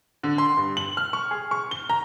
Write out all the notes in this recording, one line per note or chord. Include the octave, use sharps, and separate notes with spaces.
D3
C6
G2
F#7
F6
C#6
G#4
C#6
G7
A#5